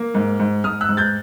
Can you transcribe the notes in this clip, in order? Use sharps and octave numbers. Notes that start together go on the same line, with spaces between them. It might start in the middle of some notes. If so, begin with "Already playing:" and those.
Already playing: A#3
G#2
G#2
G#2 D#6 F6
E6 F#6
G#2
G6 A6